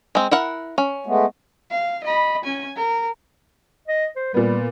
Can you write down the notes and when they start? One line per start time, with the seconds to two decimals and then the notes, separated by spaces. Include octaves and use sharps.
0.15 G#3 C4
0.31 E4 A#4 F#5
0.78 C#4
1.06 G#3 A3 B3
1.71 F5
2.04 D#5 B5
2.44 C#4 G#5
2.76 A#4
3.88 D#5
4.16 C5
4.34 A#2 G3 B3